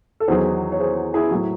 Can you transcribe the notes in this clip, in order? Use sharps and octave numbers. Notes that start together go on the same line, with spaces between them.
A4
E2 D#3 F#3 G#4 C5
C#5
G#4 C5
E4 G#4
A2 F#3